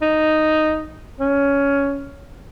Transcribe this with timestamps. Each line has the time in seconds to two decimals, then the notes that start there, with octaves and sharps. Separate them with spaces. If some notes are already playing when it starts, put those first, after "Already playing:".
0.02 D#4
1.20 C#4